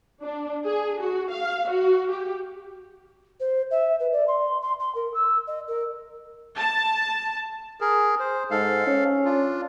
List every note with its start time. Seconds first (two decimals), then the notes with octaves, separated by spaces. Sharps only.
0.22 D4
0.66 G#4
1.02 F#4
1.32 F5
1.71 F#4
2.11 G4
3.40 C5
3.71 E5
3.99 B4
4.12 D5
4.28 C6
4.62 C6
4.79 C6
4.95 A#4
5.14 E6
5.47 D#5
5.67 A#4
6.57 A5
7.81 G#4 A#4
8.19 C5
8.51 G#2 A4 F5
8.87 C#4
9.25 D4 F4